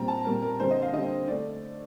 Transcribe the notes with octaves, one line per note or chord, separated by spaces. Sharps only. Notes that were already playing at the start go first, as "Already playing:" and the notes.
Already playing: A#2 G3 C4 A#5
A5
A#2 G3 C4 A#4
A#4
D3 G3 C4 C5
D#5
F5
D3 G3 C4 D#5
D3 A3 D5